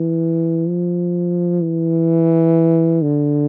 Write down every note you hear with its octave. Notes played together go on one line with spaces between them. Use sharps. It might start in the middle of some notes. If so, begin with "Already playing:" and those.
Already playing: E3
F3
E3
D3